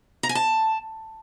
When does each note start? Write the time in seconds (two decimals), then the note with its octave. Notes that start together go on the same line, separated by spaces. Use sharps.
0.23 A#5
0.29 G#5
0.35 A5